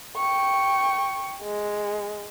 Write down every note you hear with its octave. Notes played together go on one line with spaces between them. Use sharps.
G5 C#6
G#3